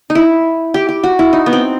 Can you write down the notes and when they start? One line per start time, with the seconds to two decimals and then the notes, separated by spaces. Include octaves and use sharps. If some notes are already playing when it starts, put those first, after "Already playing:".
0.10 D#4
0.15 E4
0.74 G4
0.89 G4
1.04 F#4
1.19 E4
1.33 D#4
1.46 B3
1.53 C4